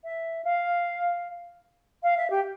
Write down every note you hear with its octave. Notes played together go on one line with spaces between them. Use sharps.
E5
F5
F5
E5
G4